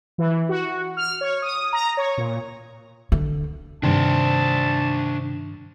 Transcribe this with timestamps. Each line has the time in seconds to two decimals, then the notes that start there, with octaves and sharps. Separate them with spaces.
0.18 E3
0.49 F#4
0.97 F6
1.21 C#5
1.42 D#6
1.73 A#5
1.97 C#5
2.17 A#2
3.12 D3
3.83 G2 C3 D#3 D4 C5 A5